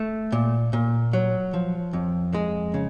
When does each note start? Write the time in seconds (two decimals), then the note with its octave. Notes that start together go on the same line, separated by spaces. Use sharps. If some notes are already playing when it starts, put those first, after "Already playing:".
Already playing: A3
0.32 A#2
0.73 A#2
1.13 F#3
1.54 F3
1.93 F2
2.34 G#3
2.74 C#3